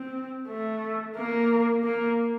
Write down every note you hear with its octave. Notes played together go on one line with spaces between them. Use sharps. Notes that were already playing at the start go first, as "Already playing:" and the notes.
Already playing: C4
A3
A#3
A#3